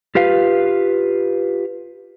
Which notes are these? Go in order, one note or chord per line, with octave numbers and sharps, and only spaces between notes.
F4 G4 B4 F5